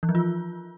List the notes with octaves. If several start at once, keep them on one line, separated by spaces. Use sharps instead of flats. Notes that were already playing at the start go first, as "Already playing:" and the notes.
E3
F3
F4